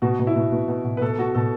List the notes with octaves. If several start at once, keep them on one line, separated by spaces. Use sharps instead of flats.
B2 F#4
B2
E4
B2
B2
B2
B2
B4
B2 A4
B2 F#4
B2 A4